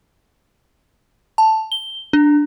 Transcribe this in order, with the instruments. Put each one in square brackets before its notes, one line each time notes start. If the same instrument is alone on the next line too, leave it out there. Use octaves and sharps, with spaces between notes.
[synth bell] A5
G7
D4